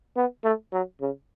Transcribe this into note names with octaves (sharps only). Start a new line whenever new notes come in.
B3
A3
F#3
C#3